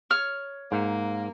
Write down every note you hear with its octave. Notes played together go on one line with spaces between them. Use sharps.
C#5 F6
G#2 A#3